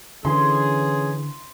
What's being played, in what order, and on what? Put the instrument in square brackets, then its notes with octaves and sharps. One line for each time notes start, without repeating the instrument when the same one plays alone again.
[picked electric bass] D3 [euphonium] E3 [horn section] C#4 G#4 [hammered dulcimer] C6